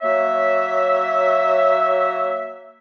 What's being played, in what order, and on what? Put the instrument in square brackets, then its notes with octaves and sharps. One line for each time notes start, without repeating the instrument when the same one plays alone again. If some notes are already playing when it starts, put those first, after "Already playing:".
[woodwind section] F#3 A#3 C#5 E5